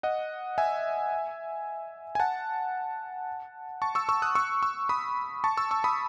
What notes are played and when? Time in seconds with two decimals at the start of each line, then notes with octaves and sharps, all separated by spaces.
0.03 D#5 F#5
0.58 E5 G#5
2.15 G#5
2.20 F#5 A5
3.82 A5 C#6
3.95 C#6 E6
4.09 C#6 E6
4.22 D#6 F#6
4.35 C#6 E6
4.62 C#6 E6
4.89 B5 D#6
5.44 A5 C#6
5.57 C#6 E6
5.71 C#6 E6
5.84 B5 D#6